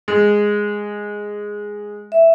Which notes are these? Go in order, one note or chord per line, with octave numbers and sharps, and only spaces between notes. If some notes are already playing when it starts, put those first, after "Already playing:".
G#3
E5